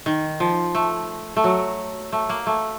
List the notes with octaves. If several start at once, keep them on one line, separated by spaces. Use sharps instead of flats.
D#3
F3
A3
A3
F#3
A3
A#3
A3